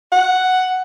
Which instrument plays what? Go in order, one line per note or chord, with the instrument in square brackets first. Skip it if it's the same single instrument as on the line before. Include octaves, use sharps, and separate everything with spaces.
[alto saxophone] F#5